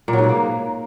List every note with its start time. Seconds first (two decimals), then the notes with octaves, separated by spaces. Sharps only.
0.08 A#2
0.13 F#3
0.18 G#2
0.24 B2
0.29 A#3